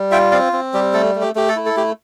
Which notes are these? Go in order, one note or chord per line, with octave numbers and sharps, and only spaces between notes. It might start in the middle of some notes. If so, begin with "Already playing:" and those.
Already playing: G3
F4 E5 G5
C4 D5 F5
C4
G3 G4
A3 A4
A3
G4
A3 G4
A4
E4
A4
A3 G4